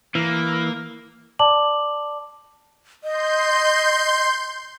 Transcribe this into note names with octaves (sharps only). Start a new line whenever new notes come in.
E3 A#3
D5 A5 D6 F#7
D#5 C6 G6